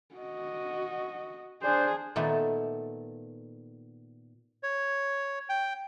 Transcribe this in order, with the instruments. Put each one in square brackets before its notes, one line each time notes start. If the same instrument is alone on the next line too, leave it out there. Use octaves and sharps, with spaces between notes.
[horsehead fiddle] F#4 D#5
[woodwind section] D4 C5 [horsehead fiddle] G#4
[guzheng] A#2 D#3 A3 B3
[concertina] C#5
G5